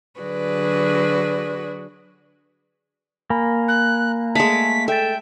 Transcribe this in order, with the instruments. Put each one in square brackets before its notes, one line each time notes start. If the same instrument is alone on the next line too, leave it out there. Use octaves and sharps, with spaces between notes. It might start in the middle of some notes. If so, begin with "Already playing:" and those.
[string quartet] D3 F#3 F#4 G#4 B4 D5
[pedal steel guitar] A#3 [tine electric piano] G#5 A#5 B5
[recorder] F#6
[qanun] G#3 A3 [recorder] B6
[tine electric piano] A4 A6 [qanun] E5 [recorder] G5